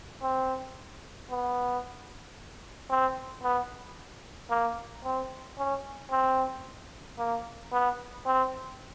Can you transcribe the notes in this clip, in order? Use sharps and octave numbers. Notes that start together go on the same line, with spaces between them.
C4
B3
C4
B3
A#3
C4
C#4
C4
A#3
B3
C4